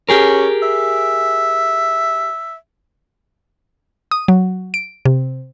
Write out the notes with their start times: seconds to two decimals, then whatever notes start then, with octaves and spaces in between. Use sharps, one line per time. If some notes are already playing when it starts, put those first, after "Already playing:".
0.09 C#4 G4 G#4 A#4
0.62 E5
4.11 D#6
4.28 F#3
4.74 D7
5.05 C3